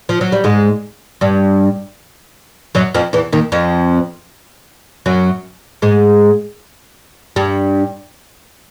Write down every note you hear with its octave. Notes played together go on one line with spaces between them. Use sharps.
F3
F#3
G3
G#2 G#3
G2 G3
F#2 F#3
F2 F3
E2 E3
D#2 D#3
F2 F3
F#2 F#3
G#2 G#3
G2 G3